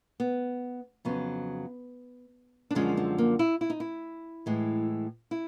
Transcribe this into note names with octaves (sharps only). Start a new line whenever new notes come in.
B3
F2 C#3 F#3 B3
D4
F#2 D3 F3 G#3 C#4
C4
A#3
E4
E4
D#4
E4
A2 E3 G#3
E4